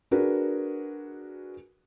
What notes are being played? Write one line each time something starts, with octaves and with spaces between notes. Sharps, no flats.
D4 F#4 G#4 A#4 B4